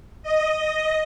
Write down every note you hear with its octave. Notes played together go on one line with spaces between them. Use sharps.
D#5